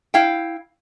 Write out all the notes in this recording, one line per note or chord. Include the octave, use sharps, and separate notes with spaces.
E4 F5 G5